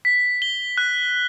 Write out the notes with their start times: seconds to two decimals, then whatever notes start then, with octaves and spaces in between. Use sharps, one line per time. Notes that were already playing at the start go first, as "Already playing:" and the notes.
0.05 B6
0.42 G7
0.77 F#6